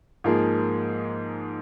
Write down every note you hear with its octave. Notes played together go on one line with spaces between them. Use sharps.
G#2 F3 A#3 G#4